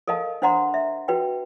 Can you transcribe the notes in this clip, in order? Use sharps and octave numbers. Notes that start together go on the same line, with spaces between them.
A4 A#4 D#5 F5 A5
D4 C5 F#5 A#5 C6
E5
F#4 B4 G5